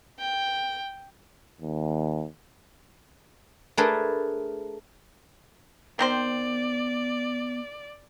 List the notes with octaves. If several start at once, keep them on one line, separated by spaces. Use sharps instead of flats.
G5
D#2
A3 D4 G#4 A#4 B4 A5
D#3 B3 C4 C5 D5